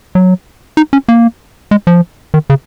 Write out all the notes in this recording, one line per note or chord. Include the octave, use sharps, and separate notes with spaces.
F#3
D#4
C#4
A#3
G#3
F3
D#3
C#3